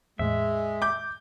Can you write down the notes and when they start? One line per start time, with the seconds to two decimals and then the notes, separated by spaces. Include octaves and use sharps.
0.19 E2 A2 G#3 E5
0.82 D6 G6